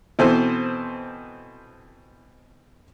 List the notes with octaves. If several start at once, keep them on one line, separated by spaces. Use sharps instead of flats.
B2 E3 C4 A4 C5